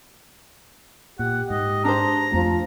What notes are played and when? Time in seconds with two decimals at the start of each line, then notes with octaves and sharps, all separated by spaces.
1.19 A#2 G4 F#5
1.50 G#2 D#5
1.84 D4 G#4 C5 A#5
2.32 F2 F3 A3 C4